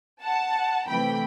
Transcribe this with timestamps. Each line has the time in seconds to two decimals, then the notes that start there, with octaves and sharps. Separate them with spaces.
0.22 F#5 A5
0.87 C3 E3 A3 G5 B5